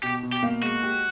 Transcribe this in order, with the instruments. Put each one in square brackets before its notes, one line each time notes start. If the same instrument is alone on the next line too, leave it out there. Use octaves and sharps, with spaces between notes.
[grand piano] B2 [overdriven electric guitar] G4
[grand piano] B2
[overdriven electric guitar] G4
[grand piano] A#3
[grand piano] G#3 [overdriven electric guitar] F#4
[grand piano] G4